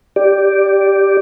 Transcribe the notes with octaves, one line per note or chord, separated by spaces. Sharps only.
G4 D5